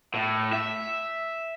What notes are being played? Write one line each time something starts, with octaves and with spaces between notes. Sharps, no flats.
A2
E5